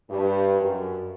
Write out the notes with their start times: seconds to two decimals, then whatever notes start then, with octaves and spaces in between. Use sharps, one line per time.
0.10 G2
0.60 F#2